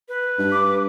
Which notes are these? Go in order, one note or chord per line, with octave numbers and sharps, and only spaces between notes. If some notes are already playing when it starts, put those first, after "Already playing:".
B4
G2
D6